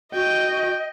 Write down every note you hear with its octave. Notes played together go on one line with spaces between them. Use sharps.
F#4 D#5 G5